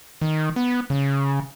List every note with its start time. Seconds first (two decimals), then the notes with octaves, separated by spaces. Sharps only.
0.21 D#3
0.56 B3
0.90 C#3